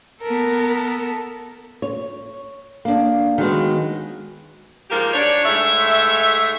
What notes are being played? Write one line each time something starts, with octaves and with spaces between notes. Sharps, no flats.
B3 A4 A#4
C#5
A#3 D4
D#3 F#3 G#3 B3
G#2 F3 A#3 G4 A#4
D4 C#5
G#2 A3 C#5 E5